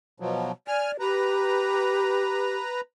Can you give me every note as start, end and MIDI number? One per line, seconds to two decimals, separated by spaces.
0.20 0.52 47
0.20 0.52 53
0.20 0.52 54
0.68 0.97 74
0.68 0.91 80
0.68 0.91 89
1.00 2.58 67
1.00 2.81 71
1.00 2.81 82